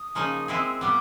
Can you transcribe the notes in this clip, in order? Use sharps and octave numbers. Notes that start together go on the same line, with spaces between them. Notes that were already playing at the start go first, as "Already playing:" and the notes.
Already playing: D#6
C#3 F3 A#3 D#4 G#4
G#3 C4 E4 G#4
A#2 G3 B3 D6